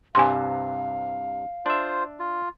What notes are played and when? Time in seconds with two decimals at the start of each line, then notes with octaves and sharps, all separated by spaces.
0.15 C2 G2 C3 F5 G#5 C6
1.66 D4 F4 C5 E5
2.20 F4